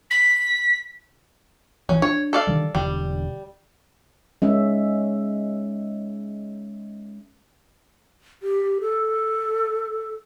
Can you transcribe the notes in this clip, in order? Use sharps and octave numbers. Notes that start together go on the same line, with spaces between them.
B6
A1 E3 C#4
D4 C#5
A4 D5 F5
D3 D#3 G3
E1 D3 G3
G#3 C#4 E5
G4
A4